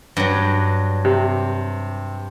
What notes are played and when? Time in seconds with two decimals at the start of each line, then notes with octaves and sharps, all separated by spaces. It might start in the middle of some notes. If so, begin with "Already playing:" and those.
0.17 G2 F#3
1.05 C3